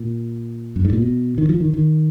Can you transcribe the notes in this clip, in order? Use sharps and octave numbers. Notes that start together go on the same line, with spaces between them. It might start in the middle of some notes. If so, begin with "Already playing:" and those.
Already playing: A#2
F#2
G#2
A#2
B2
D#3
F3
D#3
D#3